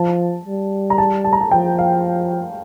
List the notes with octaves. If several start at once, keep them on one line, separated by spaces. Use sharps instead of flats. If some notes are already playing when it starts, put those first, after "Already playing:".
Already playing: F3 A5
G3
A#5
A5
A5
A#5
A5
F3 G5
F5